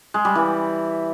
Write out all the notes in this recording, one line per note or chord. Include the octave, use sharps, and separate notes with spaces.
G#3
G3
E3